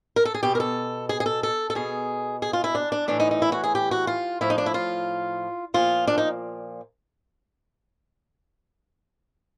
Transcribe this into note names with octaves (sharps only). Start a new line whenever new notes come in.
A#4
A4
G#4
B2 G4
A#4
A4
G#4
G#4
A4
A4
A4
B2 G#4
G#4
F4
E4
D4
D4
A2 E3 D4
D#4
D#4
E4
F#4
G#4
G4
F#4
F4
A2 F3 E4
D#4
D4
E4
F4
A#2 F3 F4
D4
D#4